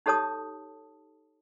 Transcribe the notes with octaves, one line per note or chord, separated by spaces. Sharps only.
D#4 G4 A4 C#5 A5 D#6